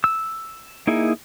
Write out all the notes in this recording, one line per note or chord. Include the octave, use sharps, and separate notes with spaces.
E6
A#3 D#4 E4 G#4